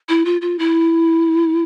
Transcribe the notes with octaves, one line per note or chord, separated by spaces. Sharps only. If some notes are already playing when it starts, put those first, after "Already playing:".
E4
F4
F4
E4